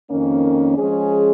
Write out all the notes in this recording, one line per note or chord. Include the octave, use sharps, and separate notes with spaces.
F2 D#3 A#3 C#4
F3 G#3 C#4 G#4